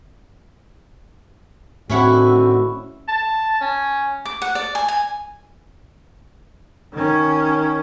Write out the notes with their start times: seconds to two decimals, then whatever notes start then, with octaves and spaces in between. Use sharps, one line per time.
1.90 A2 D3 D#3 C4 C#4 E4 F#4 F#5
3.08 A5
3.61 C#4
4.25 D6
4.42 F#5
4.55 D5
4.75 G#5
4.88 G#5
6.93 D#3 C#4